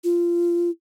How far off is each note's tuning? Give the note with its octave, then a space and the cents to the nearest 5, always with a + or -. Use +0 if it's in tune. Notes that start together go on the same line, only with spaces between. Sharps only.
F4 -20